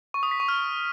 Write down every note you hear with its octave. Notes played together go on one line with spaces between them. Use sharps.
C#6
D#6
B6
C#6
F6